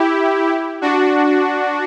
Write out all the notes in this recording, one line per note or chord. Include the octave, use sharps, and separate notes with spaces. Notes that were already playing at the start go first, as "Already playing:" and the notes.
Already playing: E4 G4
D4 F#4